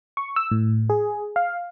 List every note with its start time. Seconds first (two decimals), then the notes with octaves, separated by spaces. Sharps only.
0.17 C#6
0.36 E6
0.51 A2
0.90 G#4
1.36 F5